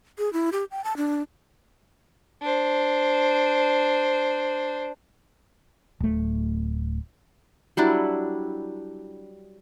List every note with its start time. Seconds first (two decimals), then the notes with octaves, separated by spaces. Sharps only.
0.19 G#4
0.33 E4
0.53 G4
0.71 G5
0.84 A5
0.97 D4
2.42 D4 C5
6.00 D1 A3
7.77 F#3 G3 D4 E4